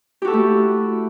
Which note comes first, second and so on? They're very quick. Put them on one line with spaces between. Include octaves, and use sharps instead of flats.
G4 F#4 A4 E4 A3